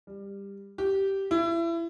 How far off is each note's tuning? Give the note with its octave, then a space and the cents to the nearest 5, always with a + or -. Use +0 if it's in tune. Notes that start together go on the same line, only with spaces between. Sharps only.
G3 +20
G4 -10
E4 +30